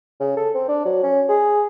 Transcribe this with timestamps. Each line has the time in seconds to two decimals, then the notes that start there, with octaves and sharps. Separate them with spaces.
0.20 C#3
0.37 A4
0.54 C4
0.68 D4
0.85 F#3
1.03 C#4
1.28 G#4